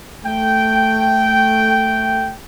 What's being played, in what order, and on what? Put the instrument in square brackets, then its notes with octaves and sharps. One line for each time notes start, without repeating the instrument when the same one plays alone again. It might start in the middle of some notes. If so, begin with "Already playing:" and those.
[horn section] A3 G5